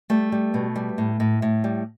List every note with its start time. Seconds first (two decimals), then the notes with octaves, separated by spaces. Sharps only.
0.10 G3 A3
0.32 G3
0.54 B2
0.76 G3
0.98 A2
1.20 A2
1.42 A2
1.64 G3